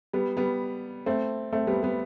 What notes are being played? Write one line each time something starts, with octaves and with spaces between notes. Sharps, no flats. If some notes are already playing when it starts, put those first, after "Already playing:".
G3 B3
G3 B3
A3 C4
A3 C4
G3 B3
G3 B3